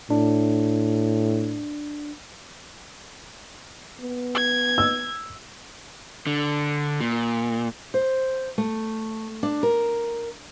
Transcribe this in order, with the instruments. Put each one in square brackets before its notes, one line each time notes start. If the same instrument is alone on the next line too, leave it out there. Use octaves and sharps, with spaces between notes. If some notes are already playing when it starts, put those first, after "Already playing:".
[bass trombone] A2 [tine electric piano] D4
[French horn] B3
[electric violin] G#6
[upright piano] E6
[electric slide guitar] D3
A#2
[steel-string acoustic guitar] C5
A3
D4
A#4